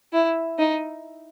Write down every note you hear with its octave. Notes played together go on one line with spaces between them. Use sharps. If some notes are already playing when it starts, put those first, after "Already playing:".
E4
D#4